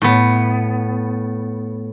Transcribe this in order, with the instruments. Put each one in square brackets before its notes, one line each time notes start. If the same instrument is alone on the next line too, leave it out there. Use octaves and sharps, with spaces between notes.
[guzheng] A2 B3